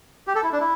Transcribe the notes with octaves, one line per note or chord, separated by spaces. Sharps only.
G4
A4
E4
D4
E4